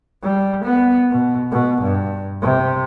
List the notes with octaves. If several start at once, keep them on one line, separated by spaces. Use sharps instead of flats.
G3
B3
B2
B2
G2
C3